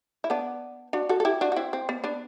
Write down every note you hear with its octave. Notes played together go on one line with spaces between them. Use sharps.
E4
B3 D4
D4 F#4
F#4 A4
A4
E4 G4
D4 F#4
F#4
C4 E4
C4
B3
B3 D4